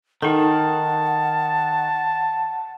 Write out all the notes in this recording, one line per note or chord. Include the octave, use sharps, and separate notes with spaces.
D#3 D#4 A4 F#5 A5